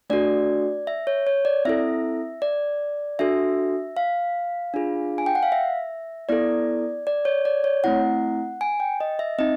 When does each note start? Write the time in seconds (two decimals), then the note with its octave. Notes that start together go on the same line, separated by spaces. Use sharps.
0.10 A3 D4 F#4 A4 D5
0.87 E5
1.07 C#5
1.27 C#5
1.45 D5
1.65 C4 E4 A4 E5
2.42 D5
3.19 D4 F#4 A4 E5
3.97 F5
4.74 D4 F4 G#4
5.18 G#5
5.26 G5
5.35 F#5
5.43 F5
5.52 E5
6.29 B3 E4 A4 D5
7.07 D5
7.25 C#5
7.45 D5
7.64 C#5
7.84 A3 C4 E4 F#5
8.61 G#5
8.80 G5
9.00 D#5
9.19 E5
9.39 C4 D#4 D#5